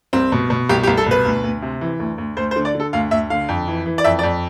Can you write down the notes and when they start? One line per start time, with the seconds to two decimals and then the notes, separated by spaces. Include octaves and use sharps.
0.13 C2 C4
0.32 B2
0.50 B2
0.69 C2 G4
0.83 G4
0.87 C2
0.97 A4
1.06 B2 B4
1.25 D2
1.44 D2
1.62 C3
1.81 E3
2.00 D2
2.18 D2
2.37 D2 C5
2.51 C5
2.56 D3
2.65 D5
2.74 D3
2.80 A4
2.93 D2 F5
3.11 D2 E5
3.30 D3 F5
3.48 F2
3.68 E3
3.86 E3
3.98 D5
4.04 F2 E5
4.19 D5
4.23 F2